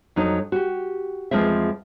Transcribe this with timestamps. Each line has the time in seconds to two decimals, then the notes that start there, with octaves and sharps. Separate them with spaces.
0.16 F2 F#3 D#4
0.52 F#4 G4
1.31 E2 F3 G#3 C4 E5